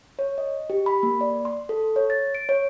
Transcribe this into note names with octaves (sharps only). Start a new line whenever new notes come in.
C#5
D#5
G4
B5
A#3
D5
C6
A4
C#5
A6
D7
C#5